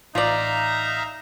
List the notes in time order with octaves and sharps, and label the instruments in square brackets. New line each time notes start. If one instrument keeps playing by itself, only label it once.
[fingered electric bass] A1 [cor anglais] D#4 [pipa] F4 D5 [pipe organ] E5 F5 A#5